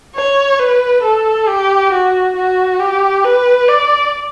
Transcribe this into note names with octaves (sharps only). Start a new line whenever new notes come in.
C#5
B4
A4
G4
F#4
F#4
G4
B4
D5